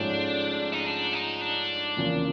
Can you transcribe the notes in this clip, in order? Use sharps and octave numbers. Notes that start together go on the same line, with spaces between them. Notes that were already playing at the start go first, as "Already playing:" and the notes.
Already playing: G#2 F3 A3 C#4 D4
D#4
D4
D#4
D4
F1 E2 C#3 F3 A#3